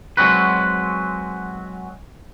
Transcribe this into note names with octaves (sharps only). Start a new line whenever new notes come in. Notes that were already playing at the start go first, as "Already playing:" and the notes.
F#3 G#3 C4 F#4 B4